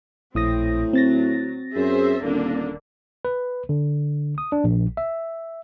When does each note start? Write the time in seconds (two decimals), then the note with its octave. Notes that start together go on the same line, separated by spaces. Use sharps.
0.35 A#1 A2 C4 D#6 A#6
0.93 F#3 C4 A6 A#6
1.76 F#2 G#4 C5 E5
2.23 D#1 D3 A#3 D4
3.25 B4
3.69 D3
4.38 D#6
4.52 D4
4.64 A#1
4.97 E5